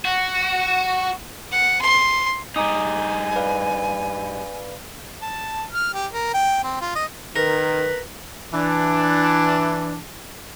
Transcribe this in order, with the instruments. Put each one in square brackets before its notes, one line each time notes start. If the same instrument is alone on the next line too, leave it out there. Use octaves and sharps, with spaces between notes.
[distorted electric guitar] F#4
[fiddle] F#5
C6
[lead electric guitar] G2 D#4 [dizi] G#5 [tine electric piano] A#5 D6 D#6
[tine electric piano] B4 D5 F5
[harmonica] A5
F6
G4
A#4
G5
C4
F4
D#5
[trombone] D#3 [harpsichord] A#4 [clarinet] B4
[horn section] E3 D4